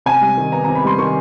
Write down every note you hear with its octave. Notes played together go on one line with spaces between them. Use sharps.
C3 G#5
G3
D#3
B3 A#5
C3 A#5
B5
G3 C6
D#3 C#6